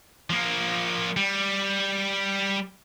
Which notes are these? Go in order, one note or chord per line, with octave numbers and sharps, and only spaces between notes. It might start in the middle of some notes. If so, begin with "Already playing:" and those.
F3 A#3
G3